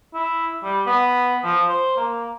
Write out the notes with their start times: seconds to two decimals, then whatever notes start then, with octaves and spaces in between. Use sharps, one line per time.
0.15 E4
0.64 G3
0.87 B3
1.44 F3
1.69 C5
1.97 A#3